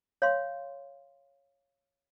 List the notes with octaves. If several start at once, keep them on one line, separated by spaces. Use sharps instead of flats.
C#5 F5 C6